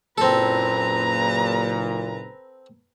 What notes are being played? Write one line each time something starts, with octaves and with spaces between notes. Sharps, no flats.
F#1 A#2 C4 A4 B4 A#5